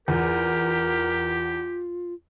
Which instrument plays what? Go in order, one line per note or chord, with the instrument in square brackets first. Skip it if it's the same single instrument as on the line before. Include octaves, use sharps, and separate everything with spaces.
[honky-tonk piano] E2 [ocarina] F4 [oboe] G4 [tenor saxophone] A#4